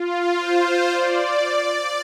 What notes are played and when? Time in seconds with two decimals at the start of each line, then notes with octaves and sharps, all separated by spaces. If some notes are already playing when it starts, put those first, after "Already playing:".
Already playing: F4
0.40 C5
0.92 D5